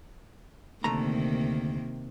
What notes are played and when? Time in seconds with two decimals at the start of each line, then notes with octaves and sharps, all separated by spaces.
0.84 D2 C3 D#3 A3 A#3 A#5